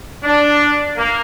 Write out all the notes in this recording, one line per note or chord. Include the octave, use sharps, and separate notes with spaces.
D4
A#3